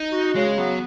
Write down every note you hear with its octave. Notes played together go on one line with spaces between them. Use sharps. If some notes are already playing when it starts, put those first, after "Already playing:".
Already playing: D#4
F#4
C#3 G#3
F#3 B3